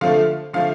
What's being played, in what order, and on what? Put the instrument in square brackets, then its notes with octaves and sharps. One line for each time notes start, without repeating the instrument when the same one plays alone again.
[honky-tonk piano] D3 F3 A3 F5
D3 F3 A3 F5